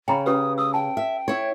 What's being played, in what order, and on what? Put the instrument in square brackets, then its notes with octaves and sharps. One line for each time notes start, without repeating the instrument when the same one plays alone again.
[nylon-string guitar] C#3 [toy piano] G5 A#5 B5
[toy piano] C#4 G4 B4 [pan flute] D#6
[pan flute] D#6 [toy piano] E6
[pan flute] G5 [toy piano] A5
[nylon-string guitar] E5
E4 C#5